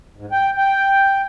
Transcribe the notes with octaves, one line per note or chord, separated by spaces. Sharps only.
G#2
G5
G5